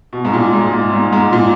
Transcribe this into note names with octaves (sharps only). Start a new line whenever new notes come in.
B2
G#2
A#2
G#2
A#2
G#2
G#2
A#2